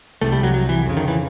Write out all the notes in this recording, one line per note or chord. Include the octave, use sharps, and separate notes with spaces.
C2 C3 A3
G3
F#3
F#3
E3
F2 C#3
D#3
E3